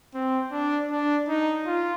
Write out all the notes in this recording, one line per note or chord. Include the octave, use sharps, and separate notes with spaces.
C4
D4
D4
D#4
F4